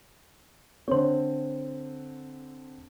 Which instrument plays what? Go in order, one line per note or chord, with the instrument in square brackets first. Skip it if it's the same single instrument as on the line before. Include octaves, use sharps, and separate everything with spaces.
[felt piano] D3 C4 [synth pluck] C5 C#5